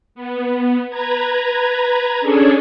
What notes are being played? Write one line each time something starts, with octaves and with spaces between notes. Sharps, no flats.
B3
B4 A#5 G#6
C#4 D4 G#4 A4 C#5